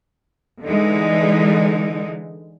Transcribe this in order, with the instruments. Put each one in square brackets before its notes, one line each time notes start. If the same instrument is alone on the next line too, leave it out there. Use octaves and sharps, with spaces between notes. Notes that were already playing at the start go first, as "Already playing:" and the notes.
[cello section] D3 E3 G#3 D#4